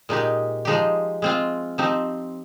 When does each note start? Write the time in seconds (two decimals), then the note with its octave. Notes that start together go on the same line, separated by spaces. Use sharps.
0.09 A#2 G#3 D#4 G4
0.65 F3 G#3 D#4 G4
1.22 G#3 C4 F4
1.78 F3 C4 D#4 G4